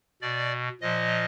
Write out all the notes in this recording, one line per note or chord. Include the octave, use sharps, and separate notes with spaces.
B2 D5
A#2 F3 D#5